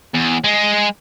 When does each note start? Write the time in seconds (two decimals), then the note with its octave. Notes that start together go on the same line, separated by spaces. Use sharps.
0.14 E2
0.44 G#3